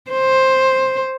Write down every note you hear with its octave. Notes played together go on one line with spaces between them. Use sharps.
C5